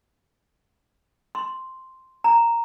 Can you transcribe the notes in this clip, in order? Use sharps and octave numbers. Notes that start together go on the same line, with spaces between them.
C6
A#5